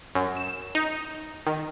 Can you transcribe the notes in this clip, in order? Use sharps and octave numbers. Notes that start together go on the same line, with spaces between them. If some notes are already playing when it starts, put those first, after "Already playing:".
F#2
E7
D#4
D#3